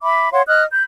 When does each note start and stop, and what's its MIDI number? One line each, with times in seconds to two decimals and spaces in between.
0.03 0.29 76
0.03 0.29 83
0.03 0.29 86
0.32 0.42 73
0.32 0.42 77
0.32 0.42 78
0.32 0.42 84
0.48 0.64 75
0.48 0.64 87
0.48 0.64 89
0.48 0.64 90
0.71 0.84 83
0.71 0.84 91